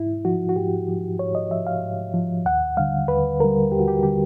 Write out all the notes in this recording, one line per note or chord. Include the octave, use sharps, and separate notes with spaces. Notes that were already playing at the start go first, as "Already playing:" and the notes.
Already playing: G#2 E4
F3 F#4
F#4
G#2 G4
F3
G#2 C#5
D#5
F3 E5
F5
G#2
F3
D#2 F#5
D3 G3 F5
D#2 B4
D3 G3 A#4
D#2 G4
F#4
G4
D3 G3 G4